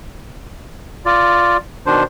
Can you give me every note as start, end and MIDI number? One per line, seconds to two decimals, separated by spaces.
1.06 1.57 65
1.06 1.57 74
1.86 2.04 47
1.86 2.04 51
1.86 2.04 62
1.86 2.04 72